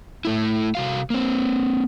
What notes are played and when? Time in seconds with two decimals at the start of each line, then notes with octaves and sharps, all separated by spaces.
0.25 A2 A3 E4
0.75 C3 F#4 F5
1.10 A#3 C4